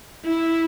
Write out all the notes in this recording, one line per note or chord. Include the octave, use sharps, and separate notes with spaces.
E4